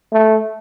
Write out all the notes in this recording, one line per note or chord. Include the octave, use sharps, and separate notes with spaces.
A3